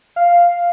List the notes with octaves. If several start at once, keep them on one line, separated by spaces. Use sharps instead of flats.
F5